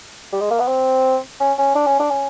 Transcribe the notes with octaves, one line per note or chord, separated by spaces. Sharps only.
G3
G#3
A#3
B3
C4
C#4
C#4
D4
C#4
D4
C#4